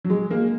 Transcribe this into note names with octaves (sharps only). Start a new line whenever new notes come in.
F#3
G#3
A#3